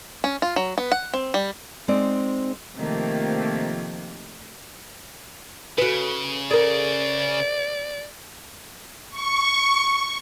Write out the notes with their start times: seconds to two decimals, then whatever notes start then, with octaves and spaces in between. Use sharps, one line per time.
0.24 C#4
0.42 F4
0.56 F#3
0.78 B3
0.92 F#5
1.14 C4
1.34 G3
1.88 G#3 C4 D#4 D5
2.76 C3 D#3 F3 A3 A#3
5.78 C#3 F#4 B4
6.51 G#4 A#4 D5
9.11 C#6